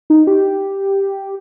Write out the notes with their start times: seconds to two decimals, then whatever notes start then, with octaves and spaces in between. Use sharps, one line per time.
0.10 D#4
0.27 G4